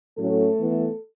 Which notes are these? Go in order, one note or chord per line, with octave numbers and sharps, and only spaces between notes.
A2 F#3 A3 C#4 A4
E3 B3